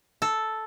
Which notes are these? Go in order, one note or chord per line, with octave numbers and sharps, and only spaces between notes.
A4